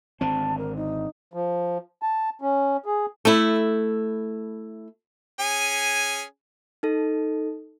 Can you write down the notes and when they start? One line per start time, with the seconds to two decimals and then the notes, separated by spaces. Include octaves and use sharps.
0.21 G#1 D3 C4 A5
0.58 A#4
0.76 D#4
1.34 F3
2.02 A5
2.42 C#4
2.86 G#4
3.25 A3 E4
5.40 C#4 G#4 G#5
6.83 D#4 A4